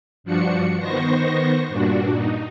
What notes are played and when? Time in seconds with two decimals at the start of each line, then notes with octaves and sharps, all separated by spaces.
0.24 G2 F3 D4 F#4 C#7
0.78 D#3 B3 C5 C#6 A#6
1.68 G2 A#2 D4 F#4
2.13 D#4